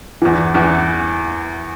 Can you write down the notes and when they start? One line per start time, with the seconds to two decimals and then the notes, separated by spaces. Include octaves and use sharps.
0.22 E2 E3
0.54 E2 E3